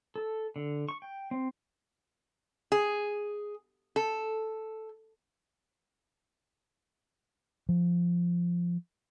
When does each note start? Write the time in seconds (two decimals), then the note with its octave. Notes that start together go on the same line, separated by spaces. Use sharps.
0.16 A4
0.56 D3
0.89 C#6
1.02 G5
1.31 C4
2.72 G#4
3.96 A4
7.69 F3